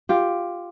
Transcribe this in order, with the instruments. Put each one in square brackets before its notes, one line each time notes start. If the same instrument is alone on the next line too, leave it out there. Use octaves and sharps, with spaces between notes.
[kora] F4 G4